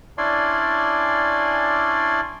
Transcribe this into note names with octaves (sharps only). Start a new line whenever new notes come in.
C#4 D4 E4 D5 G#5 C6